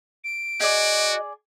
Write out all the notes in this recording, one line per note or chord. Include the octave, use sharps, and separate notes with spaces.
D7
F#4 G#4 D5 D#5